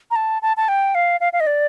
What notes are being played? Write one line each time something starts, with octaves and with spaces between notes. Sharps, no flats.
A#5
A5
A5
A5
G5
F5
F5
F5
D#5
D5